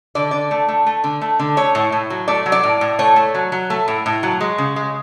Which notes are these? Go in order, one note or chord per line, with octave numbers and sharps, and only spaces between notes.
D3 D5
D3 D5
A3
A3
A3
D3
A3
D3
A3 C#5
A2
A2
F#3
A3 D5
F#3
D5
A2
A2
A3 C#5
A3
F#3
F#3
A3
A2
A2
F#3
G#3
C#3
G#3